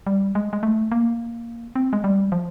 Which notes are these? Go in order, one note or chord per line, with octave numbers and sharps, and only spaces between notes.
G3
G#3
G#3
A3
A#3
C4
G#3
G3
F3